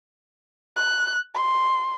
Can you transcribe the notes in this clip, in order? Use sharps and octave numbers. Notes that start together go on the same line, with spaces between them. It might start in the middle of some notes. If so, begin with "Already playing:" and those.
F#6
C6